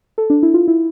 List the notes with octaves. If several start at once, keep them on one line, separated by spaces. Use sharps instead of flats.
A4
D4
E4
F4
E4